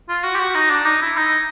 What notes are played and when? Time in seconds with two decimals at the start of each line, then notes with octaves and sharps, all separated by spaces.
0.09 F4
0.24 F#4
0.35 G4
0.40 F#4
0.55 D#4
0.70 D4
0.86 D#4
1.02 E4
1.17 D#4